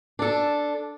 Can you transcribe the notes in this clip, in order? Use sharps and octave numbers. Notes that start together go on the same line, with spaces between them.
D4 A4